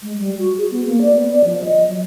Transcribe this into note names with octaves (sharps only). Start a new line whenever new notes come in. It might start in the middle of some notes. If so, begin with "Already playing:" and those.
G#3
G3
F#4
G#4
B3
A#3
D5
B3
D5
F3
D#5
F#3